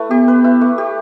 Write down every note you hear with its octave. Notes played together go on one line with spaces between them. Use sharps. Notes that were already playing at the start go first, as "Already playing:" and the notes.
Already playing: A3 E4 B4
B3 G4
B4
E4
A3
G4